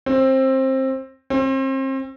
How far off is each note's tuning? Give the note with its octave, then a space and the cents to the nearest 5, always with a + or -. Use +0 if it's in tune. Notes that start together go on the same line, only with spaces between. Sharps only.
C4 +20
C4 +35